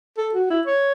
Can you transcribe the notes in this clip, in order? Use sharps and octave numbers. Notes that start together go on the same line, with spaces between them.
A4
F#4
E4
C#5